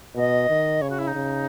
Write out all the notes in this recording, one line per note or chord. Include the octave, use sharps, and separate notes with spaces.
B2 D#5
D#3
C#3 C#5
F#4
E4
D#4
C#3